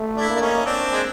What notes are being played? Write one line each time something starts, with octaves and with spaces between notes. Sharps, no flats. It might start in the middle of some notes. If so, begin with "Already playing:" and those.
Already playing: A3
D4 E4
A#3
D4
C#4 D#4
C4 D4
G#3